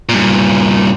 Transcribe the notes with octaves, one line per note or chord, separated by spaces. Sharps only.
G2 A#2